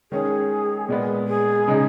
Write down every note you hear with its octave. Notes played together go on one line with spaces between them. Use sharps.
D#3 G#3 C#4 G#4
A#2 G#3 B3
G#4
C#3 G#3 D#4